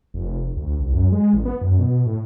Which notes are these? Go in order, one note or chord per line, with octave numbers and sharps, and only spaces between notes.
F1
D2
C2
F#2
G#3
A1
B3
F#2
B2
A2